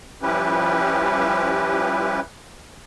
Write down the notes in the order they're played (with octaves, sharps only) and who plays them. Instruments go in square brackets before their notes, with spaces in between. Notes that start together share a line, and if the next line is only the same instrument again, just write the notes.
[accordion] F3 G3 C#4 E4 G4 B4